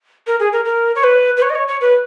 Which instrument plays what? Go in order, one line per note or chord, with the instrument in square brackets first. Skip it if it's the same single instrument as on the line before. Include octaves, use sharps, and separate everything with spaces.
[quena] A#4
G#4
A#4
A#4
C#5
B4
B4
C#5
D#5
C#5
C#5
B4